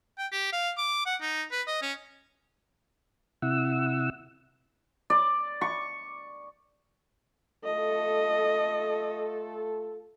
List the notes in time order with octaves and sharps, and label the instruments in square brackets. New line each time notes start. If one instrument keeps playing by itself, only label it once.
[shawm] G5
G4
F5
D6
F#5
D#4
B4
D#5
C#4
[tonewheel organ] C3 E4 F#5 E6
[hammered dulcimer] D5
C#6
[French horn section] A3 F4 A4 [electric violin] D#5